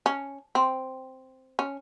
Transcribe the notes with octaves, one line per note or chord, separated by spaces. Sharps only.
C#4
C4
C#4